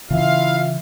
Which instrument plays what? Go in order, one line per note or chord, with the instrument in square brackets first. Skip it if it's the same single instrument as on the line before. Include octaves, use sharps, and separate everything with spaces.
[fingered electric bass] C#3 E3 [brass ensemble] E4 F4 E5 [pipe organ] F5